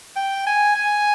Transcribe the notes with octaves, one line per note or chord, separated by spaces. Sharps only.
G5
G#5
G#5